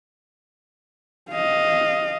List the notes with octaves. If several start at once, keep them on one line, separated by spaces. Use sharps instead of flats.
D#5 F5